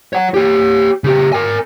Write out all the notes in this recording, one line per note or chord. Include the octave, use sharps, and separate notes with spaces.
C#5 F#5
G4 C#5
C#3 G4
A#4 G#5